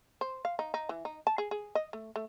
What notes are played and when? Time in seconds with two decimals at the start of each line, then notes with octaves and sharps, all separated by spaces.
0.21 C5
0.45 F5
0.59 D#4
0.74 D#4
0.89 E3
1.05 D#4
1.27 A5
1.38 G#4
1.51 G#4
1.75 D#5
1.93 A3
2.16 A3